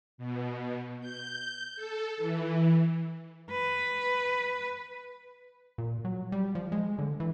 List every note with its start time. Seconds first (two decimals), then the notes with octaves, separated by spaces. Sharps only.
0.18 B2
1.01 G6
1.76 A4
2.17 E3
3.51 B4
5.78 A#2
6.05 F#3
6.32 G3
6.55 F3
6.72 G#3
6.99 D3
7.20 E3